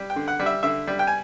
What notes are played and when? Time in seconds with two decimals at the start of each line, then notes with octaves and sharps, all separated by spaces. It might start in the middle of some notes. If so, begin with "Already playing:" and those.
Already playing: G3
0.10 G5
0.16 D3
0.28 F#5
0.39 G3
0.46 E5
0.63 D3 E5
0.87 G3
0.99 G5
1.07 G#5